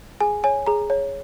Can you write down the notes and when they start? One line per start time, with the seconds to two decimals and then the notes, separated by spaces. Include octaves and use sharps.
0.21 G#4 G#5
0.44 C#5 G#5
0.67 G#4 A#5
0.90 C#5